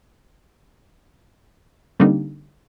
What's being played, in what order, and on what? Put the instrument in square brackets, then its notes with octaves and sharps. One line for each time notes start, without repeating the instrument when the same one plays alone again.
[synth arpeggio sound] D3 G3 A#3 C4 D4 D#4